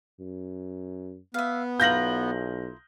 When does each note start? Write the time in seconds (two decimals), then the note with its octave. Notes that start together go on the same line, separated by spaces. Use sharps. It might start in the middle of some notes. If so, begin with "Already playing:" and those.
0.20 F#2
1.34 B3 E5 F5
1.80 B1 E4 F4 A#4 G6 A#6 F#7